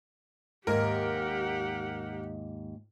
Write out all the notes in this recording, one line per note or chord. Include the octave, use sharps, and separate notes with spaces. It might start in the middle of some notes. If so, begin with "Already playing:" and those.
D#2 G#2 G4 A#4 F#5